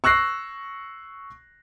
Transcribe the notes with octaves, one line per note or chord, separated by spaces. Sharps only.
C#6 E6 F#6 A#6 C7